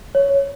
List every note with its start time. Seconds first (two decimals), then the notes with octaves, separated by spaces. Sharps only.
0.15 C#5